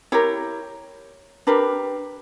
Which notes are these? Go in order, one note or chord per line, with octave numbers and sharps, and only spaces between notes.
E4 G4 A#4 C#5
D4 G4 A#4 B4